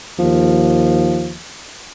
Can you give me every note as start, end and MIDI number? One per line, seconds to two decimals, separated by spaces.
0.19 1.39 39
0.19 1.35 53